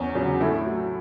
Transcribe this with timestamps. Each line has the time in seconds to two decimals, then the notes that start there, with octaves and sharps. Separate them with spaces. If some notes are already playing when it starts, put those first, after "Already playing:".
Already playing: E2 C#4
0.15 C#3 F#3
0.40 A2 E4 A4
0.66 F#3